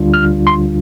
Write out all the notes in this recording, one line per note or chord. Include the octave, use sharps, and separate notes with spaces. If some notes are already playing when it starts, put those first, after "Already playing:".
Already playing: D2 D3 G3 D4 F4
F6
C6